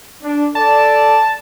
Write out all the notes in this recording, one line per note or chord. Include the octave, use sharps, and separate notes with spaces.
D4
A4 D5 A5